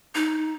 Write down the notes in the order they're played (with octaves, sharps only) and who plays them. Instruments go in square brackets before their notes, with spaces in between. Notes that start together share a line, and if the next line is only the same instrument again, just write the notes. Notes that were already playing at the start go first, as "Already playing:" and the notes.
[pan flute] D#4